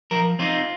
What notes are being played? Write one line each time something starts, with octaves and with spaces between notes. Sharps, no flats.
F3 A#4
C4 D#4 F4